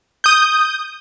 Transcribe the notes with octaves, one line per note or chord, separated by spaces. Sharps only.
D#6 G6